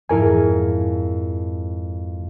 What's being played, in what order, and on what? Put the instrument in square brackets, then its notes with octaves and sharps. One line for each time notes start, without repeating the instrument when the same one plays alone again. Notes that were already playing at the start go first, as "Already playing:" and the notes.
[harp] F2 G#2 F3 [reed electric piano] E4 A#4 G#5